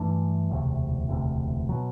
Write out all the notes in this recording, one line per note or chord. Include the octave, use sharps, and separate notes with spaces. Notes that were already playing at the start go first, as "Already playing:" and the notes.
Already playing: G2 E3 A3 D4
E1 D2 C3
E1 D2 C3
B2 F#3